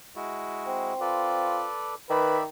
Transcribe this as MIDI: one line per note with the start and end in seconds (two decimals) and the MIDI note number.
0.16 0.94 56
0.16 0.94 64
0.16 0.94 66
0.67 1.66 60
1.01 1.68 65
1.01 1.95 69
1.01 1.95 71
1.01 1.95 74
2.10 2.46 51
2.10 2.37 71
2.10 2.43 74
2.10 2.43 76
2.10 2.43 83